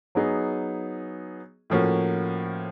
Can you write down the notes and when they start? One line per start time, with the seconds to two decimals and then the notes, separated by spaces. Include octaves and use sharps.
0.15 F#3 B3 D#4 G#4
1.70 A2 F3 A#3 C#4 F#4